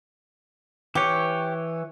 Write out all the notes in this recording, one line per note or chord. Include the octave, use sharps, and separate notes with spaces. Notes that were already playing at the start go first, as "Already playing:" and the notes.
E3 G4 C#5